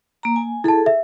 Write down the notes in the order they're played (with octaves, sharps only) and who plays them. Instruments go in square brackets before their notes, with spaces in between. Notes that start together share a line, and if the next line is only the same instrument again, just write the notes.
[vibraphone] A#3 A#5
G#5
[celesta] E4 A5 [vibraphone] G#4 A4
[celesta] E5